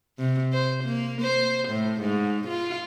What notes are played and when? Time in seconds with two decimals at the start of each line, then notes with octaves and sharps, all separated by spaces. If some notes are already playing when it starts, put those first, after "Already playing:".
0.19 C3
0.53 C5
0.84 A#3
1.22 C5
1.69 A2
2.01 G#2
2.48 F4